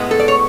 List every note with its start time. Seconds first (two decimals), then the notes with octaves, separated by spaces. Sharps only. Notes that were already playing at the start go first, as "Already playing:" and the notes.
Already playing: A2 G#3 B3
0.11 A4
0.19 D5
0.28 C#5